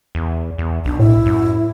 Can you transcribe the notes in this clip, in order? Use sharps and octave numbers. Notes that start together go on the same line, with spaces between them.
E2
E2
B1 D4
A2 E4
F#2